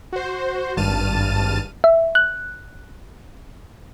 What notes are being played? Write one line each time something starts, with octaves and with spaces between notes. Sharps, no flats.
F#4 C5
G#1 G2 A5 F6 A6 D#7
E5
F#6